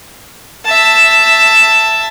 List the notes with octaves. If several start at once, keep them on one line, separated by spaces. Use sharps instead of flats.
E5 A5